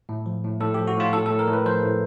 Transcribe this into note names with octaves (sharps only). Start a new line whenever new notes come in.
A2
F3
A2
A2 A4
G4
F3
F#4
A2 F4
A2 A4
A4
A2
A#4
A2
B4
F3 C5
A2